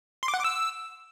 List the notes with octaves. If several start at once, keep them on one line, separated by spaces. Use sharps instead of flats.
C6
D6
F#5
D6
E6